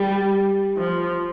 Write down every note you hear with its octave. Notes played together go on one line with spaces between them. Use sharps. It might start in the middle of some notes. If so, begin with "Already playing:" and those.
Already playing: G3
F3